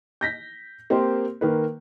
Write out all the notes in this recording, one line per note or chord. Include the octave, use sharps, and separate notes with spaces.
G6 A#6 B6
A#3 C4 G4 A#4 C5
D#3 A#3 B4